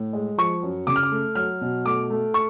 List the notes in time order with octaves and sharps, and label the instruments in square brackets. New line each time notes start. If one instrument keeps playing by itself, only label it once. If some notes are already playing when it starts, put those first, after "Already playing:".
Already playing: [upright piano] A2
G#3
F3 C#6
F#2
C#3 D6
F6
D6
A3
F#3 F6
B2
A3 D6
A3
C#6